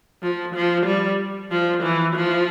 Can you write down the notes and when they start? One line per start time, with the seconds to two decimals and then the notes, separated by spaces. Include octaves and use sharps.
0.23 F3
0.55 F3
0.86 G3
1.51 F3
1.83 E3
2.16 F3